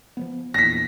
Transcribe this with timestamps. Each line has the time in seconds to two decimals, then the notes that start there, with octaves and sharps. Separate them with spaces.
0.17 F3 F#3 B3
0.54 A#1 E2 A#6 B6